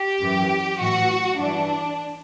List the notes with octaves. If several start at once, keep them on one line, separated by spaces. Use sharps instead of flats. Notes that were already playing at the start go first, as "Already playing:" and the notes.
Already playing: G4
F#2 E3
A2 E3 F#4
G2 E3 D4